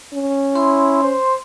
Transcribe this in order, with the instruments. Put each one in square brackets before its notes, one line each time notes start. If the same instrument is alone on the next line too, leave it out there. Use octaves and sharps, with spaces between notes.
[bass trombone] C#4
[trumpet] E4 [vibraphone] C6
[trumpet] C5